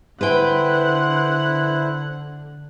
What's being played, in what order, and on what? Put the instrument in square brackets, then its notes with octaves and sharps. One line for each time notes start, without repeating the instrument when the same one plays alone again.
[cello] D3 [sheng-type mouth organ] E4 C5 [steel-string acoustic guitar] B4 G5 [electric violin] F#5